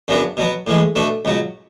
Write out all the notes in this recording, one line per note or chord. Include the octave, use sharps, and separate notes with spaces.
F#2 C#3 F#3 B3 D4
B2 F#3 B3
A2 E3 G#3
B2 A3 D4
C#2 B2 F#3